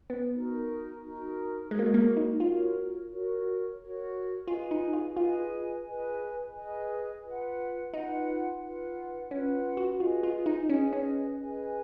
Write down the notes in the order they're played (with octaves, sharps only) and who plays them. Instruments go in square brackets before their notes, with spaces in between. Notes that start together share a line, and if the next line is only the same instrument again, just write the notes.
[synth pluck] B3
[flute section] D#4 F#4 A#4
D#4 F#4 A#4
[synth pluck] G#3 [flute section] F#4 A#4 C#5
[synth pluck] A#3
G#3
A#3
D#4
[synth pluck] F4 [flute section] F#4 A#4 C#5
[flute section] F#4 A#4 C#5
F#4 A#4 C#5
[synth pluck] F4 [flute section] G#4 B4 D#5 G#5
[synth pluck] D#4
F4
[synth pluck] F4 [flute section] G#4 B4 D#5 G#5
[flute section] G#4 B4 D#5 G#5
G#4 B4 D#5 G#5
F4 B4 F#5
[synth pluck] D#4 [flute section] F4 B4 F#5
[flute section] F4 B4 F#5
[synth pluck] C#4 [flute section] F4 B4 F#5
[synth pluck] F#4
[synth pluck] F4 [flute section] G#4 B4 D#5 G#5
[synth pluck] F4
D#4
[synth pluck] C#4 [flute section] G#4 B4 D#5 G#5
[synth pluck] C#4
[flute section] G#4 B4 D#5 G#5